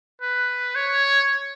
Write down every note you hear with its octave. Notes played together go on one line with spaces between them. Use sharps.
B4
C#5